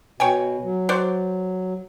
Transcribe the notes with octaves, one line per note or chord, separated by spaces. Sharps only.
B2 C#5 G5 G#5
F#3
F#4 C5 D5